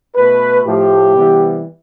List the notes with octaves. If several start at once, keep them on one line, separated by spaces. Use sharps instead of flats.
B2 A3 B4
A2 F3 A3 G4
C3 E3 G3 B3